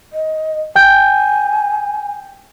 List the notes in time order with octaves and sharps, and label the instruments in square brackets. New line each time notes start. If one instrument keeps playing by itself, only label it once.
[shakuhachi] D#5
[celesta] G5 G6 [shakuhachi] G#5